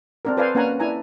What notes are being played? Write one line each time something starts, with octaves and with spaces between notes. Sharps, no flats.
C4 D4 A#4
A4 B4 C5 D5 F5 G#5
A#3 C#4 B4 F#5 G#5 A#5
D4 E4 G#5 A#5